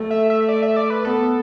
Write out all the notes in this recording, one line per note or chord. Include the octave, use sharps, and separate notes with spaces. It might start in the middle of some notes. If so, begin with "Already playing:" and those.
Already playing: A3
E5
E5
D5
E5
D5
B4
B3 A4